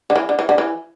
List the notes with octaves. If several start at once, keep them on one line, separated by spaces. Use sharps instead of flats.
D3
E3
D3
E3
D3
E3